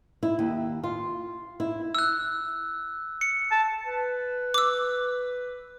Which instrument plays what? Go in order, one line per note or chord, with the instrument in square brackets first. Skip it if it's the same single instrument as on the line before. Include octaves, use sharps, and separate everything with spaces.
[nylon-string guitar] E4
D#2
F4
E4
[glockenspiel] E6 F#6
C#7
[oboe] A5
[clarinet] B4
[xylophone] D6 E6